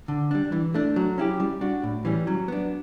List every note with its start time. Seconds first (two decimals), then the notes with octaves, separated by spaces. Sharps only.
0.08 D3
0.31 G3 D4
0.52 E3
0.74 A3 D4
0.96 F#3
1.18 C#4 E4 G4
1.40 G3
1.61 D4 F#4
1.83 A2
2.05 E3 G3 C#4
2.27 F#3
2.48 B3 D4